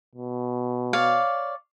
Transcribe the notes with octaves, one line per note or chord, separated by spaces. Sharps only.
B2
C#5 D5 F5